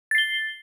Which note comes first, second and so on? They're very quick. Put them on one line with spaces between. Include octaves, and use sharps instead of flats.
A6 C7 G7